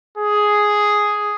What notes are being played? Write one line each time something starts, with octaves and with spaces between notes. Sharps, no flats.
G#4